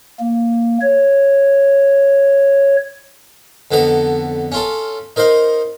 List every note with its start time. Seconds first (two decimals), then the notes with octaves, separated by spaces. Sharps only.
0.20 A#3
0.81 C#5
3.71 F2 D3 B3 A4 A#5
4.52 C#4 F4 A4
5.16 D#4 A#4 C5 D#5 F5